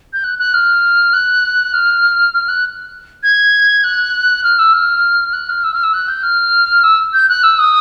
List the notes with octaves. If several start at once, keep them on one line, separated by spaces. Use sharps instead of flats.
G6
F#6
F#6
F6
F#6
F6
F6
F#6
G#6
F#6
F6
E6
F6
F#6
F6
E6
F6
E6
F#6
G6
F6
E6
G6
F#6
E6
D#6